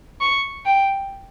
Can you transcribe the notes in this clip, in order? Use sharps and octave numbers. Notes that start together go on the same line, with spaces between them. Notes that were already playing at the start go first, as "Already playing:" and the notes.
C#6
G5